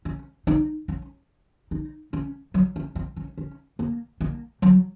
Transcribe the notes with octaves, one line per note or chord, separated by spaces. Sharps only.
C#4
D#4
C#4
D#4
C#4
F#3
C#4
C4
C#4
C#4
A#3
A#3
F#3